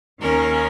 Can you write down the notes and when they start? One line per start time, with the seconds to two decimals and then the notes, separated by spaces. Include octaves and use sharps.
0.20 D#2 D#3 A#3 C#4 A#4